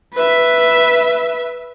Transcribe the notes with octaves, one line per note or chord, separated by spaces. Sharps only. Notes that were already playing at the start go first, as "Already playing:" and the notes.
B4 E5